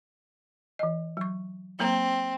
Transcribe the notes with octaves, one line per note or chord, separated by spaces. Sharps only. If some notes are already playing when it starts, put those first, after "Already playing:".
E3 D#5
F#3 C#6
F#3 A#3 C4 A#5